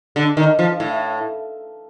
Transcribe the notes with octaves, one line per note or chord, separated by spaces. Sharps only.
D3
D#3
F3
A2